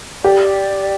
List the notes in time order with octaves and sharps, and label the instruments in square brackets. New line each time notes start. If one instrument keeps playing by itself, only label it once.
[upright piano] G4 [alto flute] D5